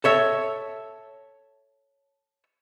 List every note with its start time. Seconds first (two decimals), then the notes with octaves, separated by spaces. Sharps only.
0.04 A4 C#5 E5